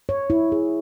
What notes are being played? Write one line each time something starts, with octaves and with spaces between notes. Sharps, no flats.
C#5
E4
G#4